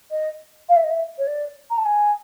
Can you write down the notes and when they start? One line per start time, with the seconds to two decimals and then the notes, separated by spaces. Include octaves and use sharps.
0.11 D#5
0.69 F5
0.76 E5
0.84 D#5
0.91 E5
1.18 C#5
1.27 D5
1.70 A#5
1.78 A5
1.85 G#5